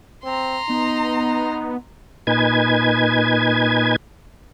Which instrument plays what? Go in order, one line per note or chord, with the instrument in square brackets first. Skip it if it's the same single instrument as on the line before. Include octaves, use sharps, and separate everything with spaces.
[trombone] C4 [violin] A#5 C6
[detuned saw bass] B3 [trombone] D#4
[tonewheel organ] A#2 D#4 B4 G#5 G#6